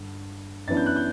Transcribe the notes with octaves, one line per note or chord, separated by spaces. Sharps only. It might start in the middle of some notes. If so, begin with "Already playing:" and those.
Already playing: G2 D3
F#2 E3 B3 D4 A6
G6
F#6
G6